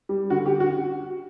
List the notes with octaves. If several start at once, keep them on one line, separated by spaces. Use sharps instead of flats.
G3
D3 F#4
G4
F#4